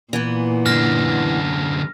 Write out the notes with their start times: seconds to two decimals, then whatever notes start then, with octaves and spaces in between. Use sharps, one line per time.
0.13 A#2 E3 B3
0.66 F#2 D3 F6 A#6